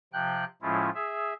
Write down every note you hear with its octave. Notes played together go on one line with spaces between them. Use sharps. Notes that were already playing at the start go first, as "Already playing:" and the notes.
C3 F3 G5 F#6
A2 F3 G#3 C#4 E4 F4
G#4 E5